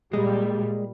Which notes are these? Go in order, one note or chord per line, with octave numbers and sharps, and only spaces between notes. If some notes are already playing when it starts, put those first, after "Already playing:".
A#2 G3 G#3